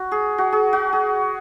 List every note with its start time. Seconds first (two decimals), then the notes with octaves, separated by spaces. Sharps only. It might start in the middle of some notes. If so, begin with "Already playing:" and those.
Already playing: F#4
0.12 G#4
0.38 F#4
0.53 G#4
0.73 F#4
0.93 G#4